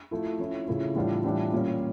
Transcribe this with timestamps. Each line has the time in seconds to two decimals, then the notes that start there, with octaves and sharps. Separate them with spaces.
0.11 F3 A3 E4
0.39 F3 C#4 E4
0.68 C#3 F3 A3 C#4 E4
0.95 A2 E3 G3 D4 F4
1.24 A2 E3 G3 D4 F4
1.52 A#2 G3 C#4